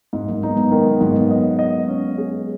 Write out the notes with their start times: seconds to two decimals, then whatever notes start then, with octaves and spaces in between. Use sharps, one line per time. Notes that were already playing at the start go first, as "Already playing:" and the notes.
0.13 G#2 G#3
0.28 F#3 A#3
0.43 G#3 B3 D#4
0.57 G#3 B3
0.71 D#3
0.87 F#3
1.00 G#2 F#3 A#3
1.16 G#3 B3
1.31 D#5
1.59 D#5
1.88 C#4
2.18 G#4